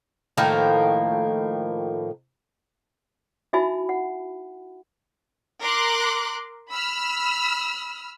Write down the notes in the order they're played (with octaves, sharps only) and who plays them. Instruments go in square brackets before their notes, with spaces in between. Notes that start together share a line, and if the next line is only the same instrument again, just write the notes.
[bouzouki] A2 D#3 F3 A#3
[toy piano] D#4 E4 F#4 E5 G#5 B5
F#5
[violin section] A#4 C6 D6 F#6
B5 E6 F6